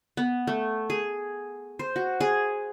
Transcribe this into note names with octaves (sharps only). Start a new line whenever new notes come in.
B3
A3
G#4
C5
F#4
G#4